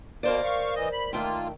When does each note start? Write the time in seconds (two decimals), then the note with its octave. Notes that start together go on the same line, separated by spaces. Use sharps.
0.23 B2 A#3 A#4 C5 D5
0.44 F5 C#6
0.75 E3 D#5
0.92 B5
1.13 D#3 A3 A#3 F4 G5